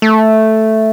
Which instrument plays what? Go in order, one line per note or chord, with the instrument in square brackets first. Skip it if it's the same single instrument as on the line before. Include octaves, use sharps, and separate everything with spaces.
[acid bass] A3